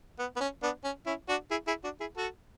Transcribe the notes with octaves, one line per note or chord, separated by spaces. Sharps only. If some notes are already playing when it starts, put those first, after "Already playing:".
B3
B3
C#4
B3 D4
C#4
C#4 E4
D4 F#4
E4 G#4
E4 G#4
D4 F#4
E4 G#4
F#4 A4